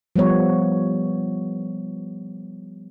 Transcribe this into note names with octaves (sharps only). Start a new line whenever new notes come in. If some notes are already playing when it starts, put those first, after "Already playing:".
F3 G3 B3 C#5